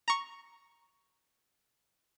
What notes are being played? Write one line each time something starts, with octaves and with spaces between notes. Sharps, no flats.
A#5 C#6